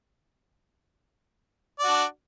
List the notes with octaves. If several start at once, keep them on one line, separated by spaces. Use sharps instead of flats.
D4 F#4 D5